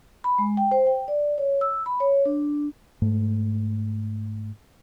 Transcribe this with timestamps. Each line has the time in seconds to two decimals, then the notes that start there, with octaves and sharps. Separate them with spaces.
0.24 B5
0.38 G#3
0.57 G5
0.71 C5
0.87 G5
1.08 D5
1.38 C#5
1.61 E6
1.86 B5
2.00 C#5
2.25 D4
3.02 G#2 A3